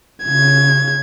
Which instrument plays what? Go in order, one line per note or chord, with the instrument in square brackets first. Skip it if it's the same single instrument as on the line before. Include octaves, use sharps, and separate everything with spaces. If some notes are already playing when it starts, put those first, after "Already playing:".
[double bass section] C#3 [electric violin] G#6